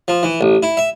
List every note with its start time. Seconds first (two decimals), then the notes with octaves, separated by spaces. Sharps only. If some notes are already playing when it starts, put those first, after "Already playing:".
0.08 F3
0.23 E3
0.41 A1
0.63 E4
0.77 E5